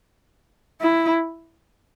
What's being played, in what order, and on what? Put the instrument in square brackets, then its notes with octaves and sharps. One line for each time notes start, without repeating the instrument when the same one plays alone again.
[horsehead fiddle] E4